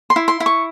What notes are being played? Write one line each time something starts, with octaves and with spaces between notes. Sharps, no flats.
C6
E4
C6
E4
C#6